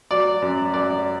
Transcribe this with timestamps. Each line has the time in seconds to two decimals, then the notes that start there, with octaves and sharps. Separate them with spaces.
0.11 F#3 D5
0.42 F#2
0.74 F#2 D5